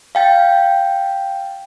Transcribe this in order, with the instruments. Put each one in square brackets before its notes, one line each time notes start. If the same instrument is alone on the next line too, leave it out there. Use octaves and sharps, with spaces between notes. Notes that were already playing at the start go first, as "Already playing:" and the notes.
[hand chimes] F5 G5 A6